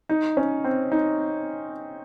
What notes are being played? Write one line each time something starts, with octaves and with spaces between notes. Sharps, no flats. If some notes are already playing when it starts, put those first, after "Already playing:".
D#4
C#4
C4
D#4